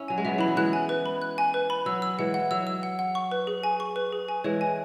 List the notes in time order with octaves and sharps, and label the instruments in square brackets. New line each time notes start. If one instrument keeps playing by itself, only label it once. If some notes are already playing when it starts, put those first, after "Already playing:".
Already playing: [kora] C#4 E4 [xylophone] E6
[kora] F#3 [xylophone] G#5
[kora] G#3
[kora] F#3 B3 [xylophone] E5
[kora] E3 [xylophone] B5
[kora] F#3
[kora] E3 G#3 [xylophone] F#6
[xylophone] G#5
B4
B5
F#6
G#5
B4
B5
[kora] F#3 [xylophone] E6
[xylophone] E6
[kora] E3 G#3 [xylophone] F#5
[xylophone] F#5
[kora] F#3 [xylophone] E6
[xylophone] E6
F#5
F#5
C#6
B4
G#4
G#5
C#6
B4
G#4
G#5
[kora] E3 G#3 [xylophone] C#5
[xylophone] G#5